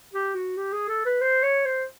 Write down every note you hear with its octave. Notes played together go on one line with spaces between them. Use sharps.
G4
F#4
G4
G#4
A4
B4
C5
C#5
C5